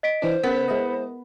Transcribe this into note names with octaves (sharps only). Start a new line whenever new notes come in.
D#5 B6 D7
E3 D4 C5
C#3 B3 A#4 B6
G#3 E4 D#5